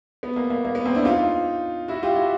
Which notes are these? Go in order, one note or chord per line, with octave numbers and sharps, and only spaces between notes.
B3
A#3
A#3
A#3
B3
A#3 C4
D4 E4
D#4 F4
E4 F#4
F4 G4
E4 F#4